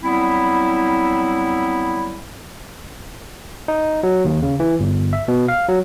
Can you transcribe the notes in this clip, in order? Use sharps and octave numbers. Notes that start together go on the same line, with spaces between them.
F#3 G3 B3 C4 E4
D#4
F#3
D#2
C#3
E3
G1
E5
B2
F5
F#3